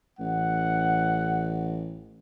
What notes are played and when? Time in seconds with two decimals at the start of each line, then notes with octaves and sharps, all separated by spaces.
0.19 A1 F#5